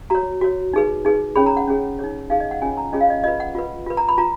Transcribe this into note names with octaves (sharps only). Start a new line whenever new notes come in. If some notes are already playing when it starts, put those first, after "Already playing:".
F#4 C#5 A#5
F#4 C#5
D#4 G#4 B4
D#4 G#4 B4
C#4 G#4 C#5 B5
A#5
F#5
C#4 G#4 C#5
D#4 G#4 C#5
D#4 G#4 C#5 F5
D#5
F#5
C#4 F4 G#4 C#5 G#5
A#5
C#4 F4 G#4 C#5 D#5
F5
D#5
F4 B4 D#5
F#5
F4 B4
F4 B4
A#5
B5
F4 A#5